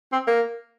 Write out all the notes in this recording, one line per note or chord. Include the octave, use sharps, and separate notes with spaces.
C4
A#3